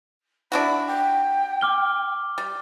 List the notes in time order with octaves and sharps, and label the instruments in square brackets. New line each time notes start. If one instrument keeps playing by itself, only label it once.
[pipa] D4 E4 F#4 [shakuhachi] B5
[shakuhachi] G5
[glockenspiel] D6 F6 G7
[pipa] G3